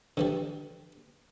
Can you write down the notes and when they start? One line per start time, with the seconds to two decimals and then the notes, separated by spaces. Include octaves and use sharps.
0.17 D3 E3 G3